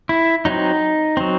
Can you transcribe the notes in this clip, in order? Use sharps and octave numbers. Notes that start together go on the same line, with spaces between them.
E4
F#3 C4 D#4
F#3 C4